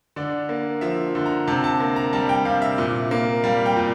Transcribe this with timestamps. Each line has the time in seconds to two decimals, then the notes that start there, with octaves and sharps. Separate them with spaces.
0.16 D3 D5
0.49 A#3
0.81 F3 E5
1.15 D3
1.26 A#5
1.47 C3 A5
1.64 A5
1.80 A#3
1.96 A#5
2.13 G3 A5
2.29 G5
2.45 C3 F5
2.62 E5
2.78 A#2
3.11 A#3
3.44 G3 F5
3.66 G5
3.76 A#2